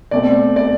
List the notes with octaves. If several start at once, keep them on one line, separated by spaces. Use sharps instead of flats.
B2 A3 C4 D5
D5